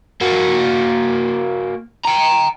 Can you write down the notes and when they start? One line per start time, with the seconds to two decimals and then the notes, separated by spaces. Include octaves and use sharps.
0.21 A#3 F#4
2.05 G5 A#5